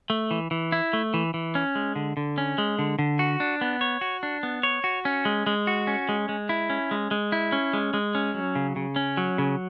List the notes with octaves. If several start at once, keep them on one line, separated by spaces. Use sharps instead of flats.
A3
E3
E3
E4
A3
E3
E3
C#4
G#3
D3
D3
C#4
G#3
D3
D3
F#4
D4
B3
C#5
F#4
D4
B3
C#5
F#4
C#4
G#3
G#3
F#4
C#4
G#3
G#3
E4
C#4
G#3
G#3
E4
C#4
G#3
G#3
C#4
F#3
C#3
C#3
C#4
F#3
C#3